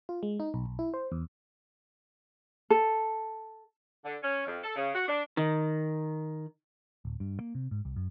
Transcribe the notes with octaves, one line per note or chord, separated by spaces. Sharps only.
F4
G#3
D#4
B1
B1
E4
C5
E2
A4
D3
C#4
F2
A4
C#3
F#4
D4
D#3
D1
G2
A#3
C3
G#2
C2
F#2